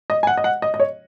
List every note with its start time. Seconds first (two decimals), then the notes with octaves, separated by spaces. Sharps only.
0.10 D#5
0.23 G#5
0.27 F#5
0.37 D#5
0.44 F#5
0.62 D#5
0.74 D#5
0.80 C#5